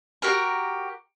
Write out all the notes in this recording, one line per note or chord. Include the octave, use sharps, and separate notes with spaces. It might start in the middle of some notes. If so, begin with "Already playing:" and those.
F#4 G4 A#4 A#5